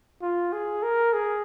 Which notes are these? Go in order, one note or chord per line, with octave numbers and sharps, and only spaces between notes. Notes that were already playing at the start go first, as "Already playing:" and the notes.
F4
G#4
A#4
G#4